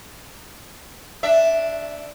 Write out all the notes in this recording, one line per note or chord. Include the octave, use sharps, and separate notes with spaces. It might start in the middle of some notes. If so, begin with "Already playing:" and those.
D4 E5